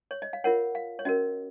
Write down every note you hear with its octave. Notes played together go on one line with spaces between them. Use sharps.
C#5
D#5
F5
F4 A#4 C#5 F#5
F5
C#5
C#4 F#4 A#4 D#5